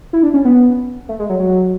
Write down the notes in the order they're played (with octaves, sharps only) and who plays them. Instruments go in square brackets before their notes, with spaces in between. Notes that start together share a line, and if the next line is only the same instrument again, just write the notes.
[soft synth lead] E4
D4
C#4
B3
A3
G#3
F#3
F#3